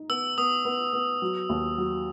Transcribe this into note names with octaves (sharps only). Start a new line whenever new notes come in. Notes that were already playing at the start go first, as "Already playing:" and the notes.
Already playing: D#4
B3 E6
B3 D#6
B3
B3
F#3
D#2
F#3